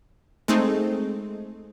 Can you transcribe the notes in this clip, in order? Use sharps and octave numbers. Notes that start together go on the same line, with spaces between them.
G#3 A3 C4 D#4